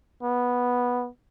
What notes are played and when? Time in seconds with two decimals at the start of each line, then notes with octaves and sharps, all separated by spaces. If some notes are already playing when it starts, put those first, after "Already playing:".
0.23 B3